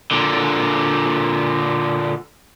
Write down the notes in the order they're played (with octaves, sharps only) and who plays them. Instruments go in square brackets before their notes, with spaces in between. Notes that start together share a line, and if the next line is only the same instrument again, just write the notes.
[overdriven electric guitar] A#2 D3